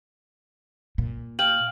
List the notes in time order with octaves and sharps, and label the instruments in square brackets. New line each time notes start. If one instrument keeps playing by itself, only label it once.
[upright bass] A#2
[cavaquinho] F5 G5 [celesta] F#7